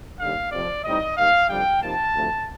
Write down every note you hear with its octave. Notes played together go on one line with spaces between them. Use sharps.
D#2 D3 G3 F5
F2 C3 F3 D5
A2 G3 C4 D#4 D#5
D#2 D#3 G3 F5
F2 D3 G3 G5
C3 F3 A#3 D#4 A5
D2 C3 F3 A3